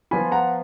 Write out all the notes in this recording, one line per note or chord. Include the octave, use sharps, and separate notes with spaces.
F3 B3 F4 G#5 B5
F#5 A#5